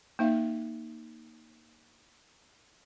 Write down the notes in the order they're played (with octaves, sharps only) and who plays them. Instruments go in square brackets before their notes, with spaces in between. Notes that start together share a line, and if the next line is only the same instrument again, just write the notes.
[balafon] A#3 D#4 E5 F5